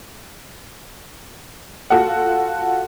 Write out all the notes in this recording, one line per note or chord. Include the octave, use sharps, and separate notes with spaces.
F4 F#4 A4 F#5